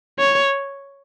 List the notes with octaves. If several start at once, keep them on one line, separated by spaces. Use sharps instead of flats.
C#5